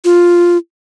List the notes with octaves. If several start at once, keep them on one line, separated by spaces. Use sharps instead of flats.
F4